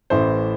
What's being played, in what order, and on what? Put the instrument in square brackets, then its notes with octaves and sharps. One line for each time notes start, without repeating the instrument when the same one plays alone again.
[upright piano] A1 A2 E3 C5 E5